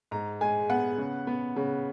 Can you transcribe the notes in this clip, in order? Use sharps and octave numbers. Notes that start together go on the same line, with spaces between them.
G#2 A#5
G#3 G#5
B3 F#5
C#3
B3
C#3